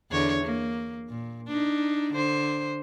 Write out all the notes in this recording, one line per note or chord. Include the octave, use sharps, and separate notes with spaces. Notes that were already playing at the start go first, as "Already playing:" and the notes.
E2 D3 C#5
A#3
A#2
D4 D#4
D3 C5